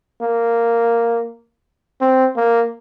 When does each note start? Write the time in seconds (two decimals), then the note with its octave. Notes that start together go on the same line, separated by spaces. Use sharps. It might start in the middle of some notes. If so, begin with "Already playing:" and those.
0.22 A#3
2.01 C4
2.37 A#3